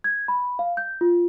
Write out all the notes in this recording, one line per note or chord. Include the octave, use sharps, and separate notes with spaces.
G#6
B5
F5
G6
F4